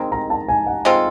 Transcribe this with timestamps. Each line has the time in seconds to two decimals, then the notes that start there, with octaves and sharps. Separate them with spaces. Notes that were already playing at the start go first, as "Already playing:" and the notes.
Already playing: D#3 G#3 C4 A#5
0.12 A#5
0.30 A5
0.48 G#5
0.67 F#5
0.85 G#3 C4 F4 A4